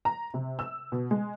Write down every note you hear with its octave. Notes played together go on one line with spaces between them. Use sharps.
A#5
C3
E6
B2
G#3